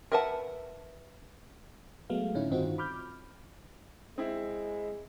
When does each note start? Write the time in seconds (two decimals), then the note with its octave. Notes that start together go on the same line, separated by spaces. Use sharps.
0.12 A#4 B4 E5 F#5 A5
2.10 F#3 G#3 A3 B3 F5
2.35 A2 D3 C#4 D#4 E4
2.51 G2 D#3 C4 D#4 F4 F#4
2.78 B5 D6 F6 G6
4.18 G#3 C4 E4